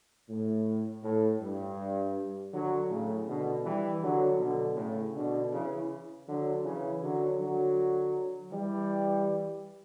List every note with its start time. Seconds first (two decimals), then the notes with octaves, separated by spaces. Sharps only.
0.28 A2
1.03 A2
1.40 G2
2.53 D3 F#3
2.90 A2 C#3
3.27 B2 D3
3.64 E3 G3
4.02 D3 F#3
4.40 B2 D3
4.77 A2 C#3
5.15 B2 D3
5.52 C#3 E3
6.27 D3 F#3
6.64 C#3 E3
7.02 D3 F#3
7.39 D3 F#3
8.51 E3 G3